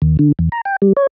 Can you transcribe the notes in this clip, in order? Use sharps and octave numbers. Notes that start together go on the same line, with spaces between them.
D#2
D3
E2
A#5
G5
G3
C#5